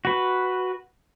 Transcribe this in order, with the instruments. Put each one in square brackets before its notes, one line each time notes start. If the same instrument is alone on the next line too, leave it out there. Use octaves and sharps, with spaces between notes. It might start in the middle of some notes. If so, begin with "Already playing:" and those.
[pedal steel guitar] F#4 B4